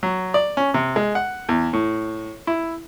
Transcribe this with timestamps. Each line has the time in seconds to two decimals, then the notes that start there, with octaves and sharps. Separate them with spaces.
0.03 F#3
0.34 D5
0.57 C#4
0.74 C3
0.96 G#3
1.15 F#5
1.49 E2
1.73 A2
2.47 E4